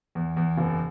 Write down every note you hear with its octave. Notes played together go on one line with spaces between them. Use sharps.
E2
E2
F#1